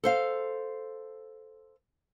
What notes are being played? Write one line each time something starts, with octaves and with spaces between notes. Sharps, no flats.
A4 C5 F5